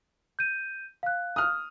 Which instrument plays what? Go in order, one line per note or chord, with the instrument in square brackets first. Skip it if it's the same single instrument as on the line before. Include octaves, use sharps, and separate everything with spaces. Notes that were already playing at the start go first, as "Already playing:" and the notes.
[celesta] G6 D#7
F5 F#6
[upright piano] D#6 F6